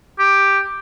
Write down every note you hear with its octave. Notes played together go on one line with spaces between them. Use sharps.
G4